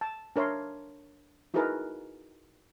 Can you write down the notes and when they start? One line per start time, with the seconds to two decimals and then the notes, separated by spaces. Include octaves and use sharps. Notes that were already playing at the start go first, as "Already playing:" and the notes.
0.01 A5
0.36 D4 A#4 C#5 E5 C6
1.54 D#4 E4 F#4 G#4 A#4 B4